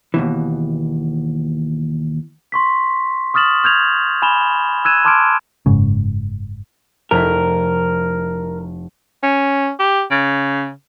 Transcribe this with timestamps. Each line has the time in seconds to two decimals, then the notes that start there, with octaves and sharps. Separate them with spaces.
0.14 D#2 B2 E3
2.52 C6 C#6 B6
3.34 C#6 D#6 F6 A6 E7 F#7
3.64 F6 G6 G#6 F7
4.22 G#5 B5 E7 F7 G7
4.85 E6 F#6 G#6 D#7 E7
5.05 A5 C6 D6 F6 G#6 D7
5.66 F#1 G#2 C#3
7.11 F1 E4 A#4
9.23 C#4
9.79 G4
10.11 C#3